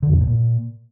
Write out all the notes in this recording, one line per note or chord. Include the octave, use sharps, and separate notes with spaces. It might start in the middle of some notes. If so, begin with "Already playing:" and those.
D3
F2
B2
A2
A#2